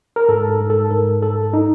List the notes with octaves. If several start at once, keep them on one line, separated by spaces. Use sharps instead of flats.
A#4
G#2 A4
A4
G#2
A4
G#2 A#4
G#2 A4
D#4